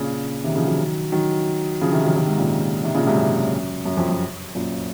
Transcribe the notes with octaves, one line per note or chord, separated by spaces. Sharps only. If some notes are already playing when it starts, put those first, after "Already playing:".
Already playing: A#2 C#3
C3 D#3
C#3 F3
D#3 F#3
D#3 F#3
C#3 F3
C3 D#3
D#3 F#3
C3 D#3
G#2 C3
A#2 C#3
C3 D#3
A#2 C#3
G#2 C3
F#2
F#2
F2
F#2
F#2 A#2